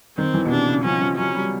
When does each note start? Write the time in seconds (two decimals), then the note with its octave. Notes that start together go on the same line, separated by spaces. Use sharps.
0.17 D#3 C4
0.34 E3
0.45 B2
0.50 C3 D4
0.67 C#3
0.84 F3 C#4
1.01 F3
1.17 F#3 C#4
1.35 G3